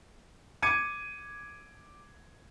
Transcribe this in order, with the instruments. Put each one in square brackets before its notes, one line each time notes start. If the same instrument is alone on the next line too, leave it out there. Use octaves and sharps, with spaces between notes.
[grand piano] D6 G#6 C#7 D#7